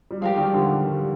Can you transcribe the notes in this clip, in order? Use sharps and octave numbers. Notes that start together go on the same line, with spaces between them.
G3
F3 G#3 G4 A#4 F5
D#3 G3
D3 F3
D#3 G3